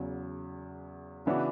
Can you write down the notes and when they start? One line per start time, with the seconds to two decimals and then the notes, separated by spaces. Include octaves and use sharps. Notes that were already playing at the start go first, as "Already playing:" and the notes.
Already playing: E2 C#3 F#3
1.26 C#3 E3 B3 D4 F#4